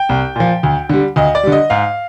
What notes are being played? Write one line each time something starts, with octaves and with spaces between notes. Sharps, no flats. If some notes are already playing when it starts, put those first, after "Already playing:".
Already playing: G5
C2
A#2 F3
D2
D3 G3
D2 D#5
D5
D3 G3
D#5
G#2 F5